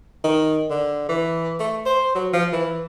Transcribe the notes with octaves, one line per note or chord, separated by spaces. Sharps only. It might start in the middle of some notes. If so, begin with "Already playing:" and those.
D#3
D3
E3
A3
C5
F#3
F3
E3